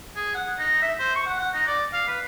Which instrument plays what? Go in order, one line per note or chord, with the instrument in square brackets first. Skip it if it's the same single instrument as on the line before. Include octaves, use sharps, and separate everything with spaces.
[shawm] G#4
F#5
D#4
E5
C5
C#6
F#5
F#5
D#4
D5
F5
B4